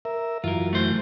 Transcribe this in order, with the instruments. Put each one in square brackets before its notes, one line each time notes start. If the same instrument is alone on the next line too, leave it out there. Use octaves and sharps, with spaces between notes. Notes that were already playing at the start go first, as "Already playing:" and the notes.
[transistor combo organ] A#4 E5
[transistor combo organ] F#2 E3 [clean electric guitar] F4 A#4
[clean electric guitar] A3 C5